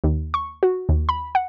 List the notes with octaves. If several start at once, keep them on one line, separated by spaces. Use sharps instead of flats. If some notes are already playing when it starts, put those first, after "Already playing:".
D#2
C#6
F#4
D#2
B5
F#5